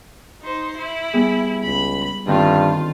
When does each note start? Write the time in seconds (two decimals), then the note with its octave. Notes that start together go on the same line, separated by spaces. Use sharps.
0.42 D#4 C5
0.78 E4
1.13 G3 B3 G#4
1.64 C#2 B5
2.27 G2 D3 D#3 C4 F4